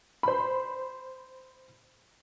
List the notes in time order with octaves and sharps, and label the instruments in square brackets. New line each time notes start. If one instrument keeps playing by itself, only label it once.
[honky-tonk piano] C5 B5